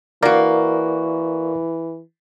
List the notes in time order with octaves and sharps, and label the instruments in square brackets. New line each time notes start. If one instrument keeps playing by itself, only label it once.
[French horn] E3 [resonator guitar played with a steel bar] A#3 F#4 [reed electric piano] A#4 D5 F5